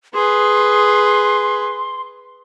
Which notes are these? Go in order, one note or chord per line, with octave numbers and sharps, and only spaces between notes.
G#4 B4 C6